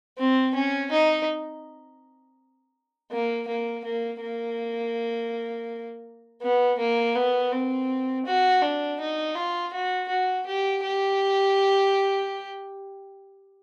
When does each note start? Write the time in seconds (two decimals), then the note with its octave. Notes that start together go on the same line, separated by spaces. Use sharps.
0.18 C4
0.55 C#4
0.92 D#4
3.12 A#3
3.48 A#3
3.85 A#3
4.21 A#3
6.42 B3
6.79 A#3
7.15 B3
7.52 C4
8.26 F#4
8.62 D4
9.00 D#4
9.36 F4
9.73 F#4
10.09 F#4
10.46 G4
10.83 G4